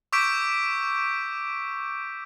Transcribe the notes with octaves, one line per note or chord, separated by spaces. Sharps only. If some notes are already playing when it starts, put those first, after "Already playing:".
C#6 D6 E6 G6 B6 D7